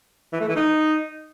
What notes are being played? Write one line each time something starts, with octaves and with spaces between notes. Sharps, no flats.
E3
A3
E3
D#4